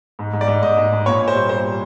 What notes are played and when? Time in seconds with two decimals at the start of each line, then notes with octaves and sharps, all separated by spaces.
0.19 G#2
0.33 G#2
0.41 D5
0.48 G#2
0.62 G#2 D#5
0.77 G#2
0.92 G#2
1.06 A#2 C#5
1.20 A#2
1.28 C5
1.35 G3
1.49 G3 C5
1.64 G3